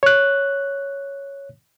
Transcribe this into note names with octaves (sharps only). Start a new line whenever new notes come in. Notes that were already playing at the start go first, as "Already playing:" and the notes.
C#5 F#6